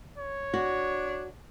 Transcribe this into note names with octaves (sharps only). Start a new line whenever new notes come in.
C#5
D4 F#4